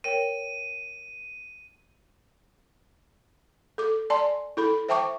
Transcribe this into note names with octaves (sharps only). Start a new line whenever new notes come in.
A#4 C#5 G5 D#7
A4 D6
D5 G#5 A5 C6
E4 A4 B5
C5 E5 G5 A5 C#6 D6